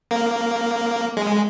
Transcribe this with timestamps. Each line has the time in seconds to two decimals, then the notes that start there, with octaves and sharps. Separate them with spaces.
0.11 A#3
1.17 G#3